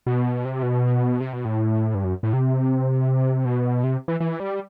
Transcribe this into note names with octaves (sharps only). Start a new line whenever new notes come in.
B2
C3
B2
C3
B2
A2
G2
F#2
A2
C3
B2
C3
E3
E3
G3